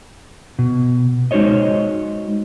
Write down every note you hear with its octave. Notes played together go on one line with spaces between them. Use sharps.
B2
G#3 D#4 F#4 C5 C#5 D#5